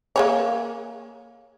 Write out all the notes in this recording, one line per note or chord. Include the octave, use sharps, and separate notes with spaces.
A#3 G#4 C#5